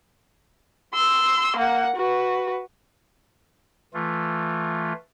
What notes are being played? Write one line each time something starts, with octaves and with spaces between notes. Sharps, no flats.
C6 E6
A#3 F#5
F#4 B4
E3 A3 F4